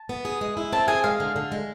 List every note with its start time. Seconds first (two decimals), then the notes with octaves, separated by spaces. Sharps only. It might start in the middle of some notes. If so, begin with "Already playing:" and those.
Already playing: A5
0.09 B3
0.25 G#4
0.41 G#3
0.57 E4
0.73 C4 A5
0.88 G#4 G#5
1.04 G#3 F5
1.20 D3
1.36 D3
1.52 G#3